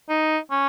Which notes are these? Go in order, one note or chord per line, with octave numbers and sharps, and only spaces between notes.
D#4
C#4